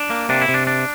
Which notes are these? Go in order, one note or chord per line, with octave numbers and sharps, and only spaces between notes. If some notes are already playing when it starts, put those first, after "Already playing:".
Already playing: D4
A#3
C3 D4
E4
C3
D4
D4